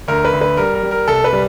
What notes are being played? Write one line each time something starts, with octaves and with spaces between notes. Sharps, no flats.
D2 A#4
B4
D2
B4
G3 A#4
A#4
G3
A#4
C2 A4
B4
G3